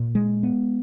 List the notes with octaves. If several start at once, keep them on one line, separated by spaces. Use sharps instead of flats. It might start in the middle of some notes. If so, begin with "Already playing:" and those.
Already playing: A#2
G#3
B3